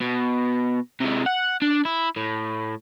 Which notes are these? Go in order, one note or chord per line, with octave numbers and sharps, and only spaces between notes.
B2
C3 G#3
F#5
D4
E4
A2